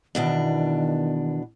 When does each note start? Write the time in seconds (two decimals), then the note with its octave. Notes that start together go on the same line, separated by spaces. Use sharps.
0.15 E2 B2 D#3 D4